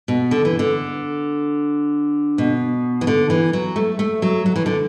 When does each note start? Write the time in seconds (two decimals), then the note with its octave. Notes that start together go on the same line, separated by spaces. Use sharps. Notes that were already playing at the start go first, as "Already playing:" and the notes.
0.08 B2
0.31 D3
0.45 E3
0.59 D3
2.38 B2
3.01 E3
3.07 D3
3.30 E3
3.53 F#3
3.76 A3
3.99 A3
4.22 F#3
4.46 F#3
4.56 E3
4.66 D3